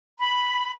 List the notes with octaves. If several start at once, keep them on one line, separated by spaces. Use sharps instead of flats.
B5